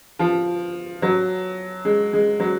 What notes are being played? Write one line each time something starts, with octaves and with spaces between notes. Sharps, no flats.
F3
F#3
G#3
G#3
F#3